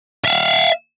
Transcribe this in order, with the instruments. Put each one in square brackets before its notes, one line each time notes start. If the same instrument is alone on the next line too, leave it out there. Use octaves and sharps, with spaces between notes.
[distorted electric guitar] E5 F5